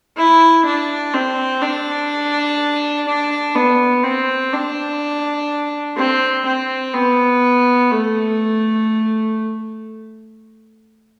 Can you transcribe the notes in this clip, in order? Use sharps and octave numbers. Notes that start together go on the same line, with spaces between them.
E4
D4
C4
D4
D4
B3
C4
D4
C4
C4
B3
A3